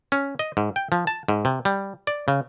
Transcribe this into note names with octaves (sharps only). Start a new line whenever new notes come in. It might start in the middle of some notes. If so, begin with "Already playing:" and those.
C#4
D#5
G#2
G5
F3
A5
G#2
C3
G3
D5
C#3